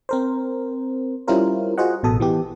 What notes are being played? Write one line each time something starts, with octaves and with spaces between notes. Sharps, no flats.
C4 A#4 C5
G3 C#4 E4 F4 A#4 C5
F4 F#4 G#4 C5 D#5 F#5
A1 B2 A4 D#6
E3 B3 G4